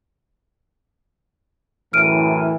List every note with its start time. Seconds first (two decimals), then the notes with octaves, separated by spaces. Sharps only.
1.93 F#2 A2 E3 F6 D7 D#7